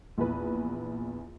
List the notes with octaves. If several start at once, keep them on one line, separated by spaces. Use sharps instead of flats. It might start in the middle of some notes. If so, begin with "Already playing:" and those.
A#1 E2 B4